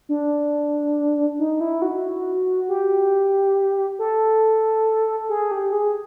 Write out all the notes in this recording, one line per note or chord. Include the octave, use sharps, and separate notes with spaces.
D4
D#4
E4
F#4
G4
A4
G#4
G4
G#4